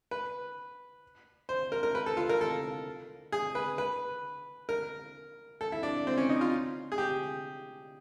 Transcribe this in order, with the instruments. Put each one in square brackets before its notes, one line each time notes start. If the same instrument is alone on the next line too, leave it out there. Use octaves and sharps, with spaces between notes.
[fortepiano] B4
C5
A#4
A#4
B4
A4
F4
A#4
A4
G#4
B4
B4
A#4
A4
E4
D4
C4
C#4
D#4
F4
G#4
G4